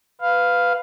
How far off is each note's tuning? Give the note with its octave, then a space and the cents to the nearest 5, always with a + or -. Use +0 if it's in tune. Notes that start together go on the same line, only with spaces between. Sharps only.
B4 +10 F5 +0